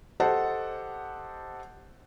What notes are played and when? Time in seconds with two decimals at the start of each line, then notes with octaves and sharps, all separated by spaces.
0.20 G4 A4 C5 D#5 F#5 A5